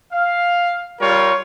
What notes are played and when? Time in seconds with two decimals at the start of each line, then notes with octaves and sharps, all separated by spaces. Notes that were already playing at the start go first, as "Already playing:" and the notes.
0.12 F5
1.00 G3 F4 A#4 C#5